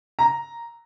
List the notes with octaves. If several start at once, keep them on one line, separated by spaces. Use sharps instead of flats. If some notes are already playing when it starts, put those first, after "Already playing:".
A#5